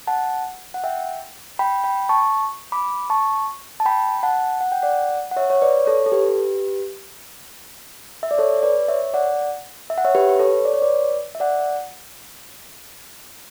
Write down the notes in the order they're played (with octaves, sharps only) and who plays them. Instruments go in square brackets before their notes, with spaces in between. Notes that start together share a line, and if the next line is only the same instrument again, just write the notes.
[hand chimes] F#5 A5
F#5
E5 G5
G5 B5
G5 B5
A5 C#6
B5 D6
A5 C#6
A5
G5 B5
F#5 A5
F#5
G5
D5 F#5
F#5
C#5 E5
C#5
B4 D5
A4 C#5
A4
G4 B4
E5
D5
A4 C#5
B4 D5
C#5 E5
D5 F#5
E5
F#5
C#5 E5
G4 B4
B4
A4 C#5
D5
C#5
B4 D5
E5
D5 F#5